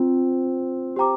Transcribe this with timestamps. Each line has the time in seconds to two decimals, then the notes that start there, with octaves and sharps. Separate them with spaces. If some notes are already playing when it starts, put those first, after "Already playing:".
Already playing: C4 F4 C5 G5
0.96 G4 C5 G5 A#5 D6